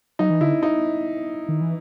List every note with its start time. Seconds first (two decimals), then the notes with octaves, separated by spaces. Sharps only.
0.19 F#3 D#4
0.30 E3
0.41 D3 E4
0.63 D#4
1.49 D#3
1.61 E3